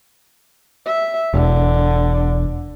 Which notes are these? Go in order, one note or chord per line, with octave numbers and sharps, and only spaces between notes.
E5
E1 D3